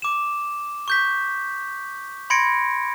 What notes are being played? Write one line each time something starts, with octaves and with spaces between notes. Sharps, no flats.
D6 E7
C#6 G6 B6
B5 C6 G#6 A#6 C#7 D7